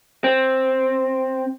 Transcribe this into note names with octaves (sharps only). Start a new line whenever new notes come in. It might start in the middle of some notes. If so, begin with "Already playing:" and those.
C4